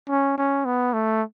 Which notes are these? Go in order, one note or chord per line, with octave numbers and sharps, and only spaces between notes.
C#4
C#4
B3
A3